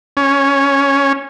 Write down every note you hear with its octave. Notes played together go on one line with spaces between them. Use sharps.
C#4